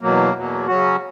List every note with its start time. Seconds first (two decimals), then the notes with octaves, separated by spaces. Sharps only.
0.01 E2 B2 F#3 A#3
0.34 E2 B2 F#3 A#3
0.67 C#3 F#3 C#4 F#4